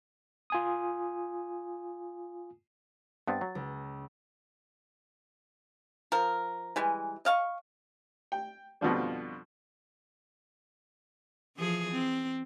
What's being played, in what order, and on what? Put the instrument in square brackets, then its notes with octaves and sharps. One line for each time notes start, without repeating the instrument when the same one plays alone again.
[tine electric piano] F4 G#5 D#6
[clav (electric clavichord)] G2 B3 C4 [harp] A6
[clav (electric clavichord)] F#3
[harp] C#2
[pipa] F3 A#4
E3 G3 G#3
D#5 F5 C#6
[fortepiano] G5
F2 B2 D3 F3 G3
[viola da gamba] E3 F3 G#4
C4